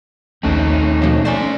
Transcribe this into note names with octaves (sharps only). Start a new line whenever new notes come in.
A#1 D#2 A3 C4 C#4 D#4
B2 F3 A#3
C5 D5 G#5 C6